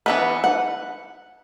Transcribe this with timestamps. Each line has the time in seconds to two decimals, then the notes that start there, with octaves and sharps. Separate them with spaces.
0.06 E3 B3 B4
0.44 F#5